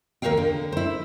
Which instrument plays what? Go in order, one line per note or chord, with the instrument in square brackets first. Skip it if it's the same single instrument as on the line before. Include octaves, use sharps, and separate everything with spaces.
[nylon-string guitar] D#2 A#4 C5 C#5 F5 G5
D3
E4 C5